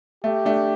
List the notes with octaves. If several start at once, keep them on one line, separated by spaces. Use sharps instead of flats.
A3 G4
A3 D4